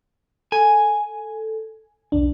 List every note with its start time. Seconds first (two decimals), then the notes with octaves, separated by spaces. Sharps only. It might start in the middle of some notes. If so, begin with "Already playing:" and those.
0.52 A4 G#5
2.12 B1 E2 D4